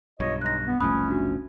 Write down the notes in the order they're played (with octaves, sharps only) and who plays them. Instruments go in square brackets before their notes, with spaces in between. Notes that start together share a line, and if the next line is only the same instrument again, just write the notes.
[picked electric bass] B1 G2 [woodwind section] F4 C#5 D#5
[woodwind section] G#3 D#4 [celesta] F#6 A#6
[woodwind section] B3
[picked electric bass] F#1 C2 F3 [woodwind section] A3 C#4 [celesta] B5 D#6 F#6
[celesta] D4 F#4